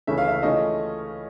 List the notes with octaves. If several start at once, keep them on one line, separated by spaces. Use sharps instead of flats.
C#2 C#3 E3 A3 C#4 E5
F5
E5
C#3 E3 A3 C#4 F4 D#5